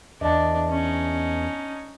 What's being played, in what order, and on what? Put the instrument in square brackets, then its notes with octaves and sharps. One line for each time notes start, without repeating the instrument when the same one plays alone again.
[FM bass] E2 [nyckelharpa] D4 [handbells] D#5 A5
[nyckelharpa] C#4 D#4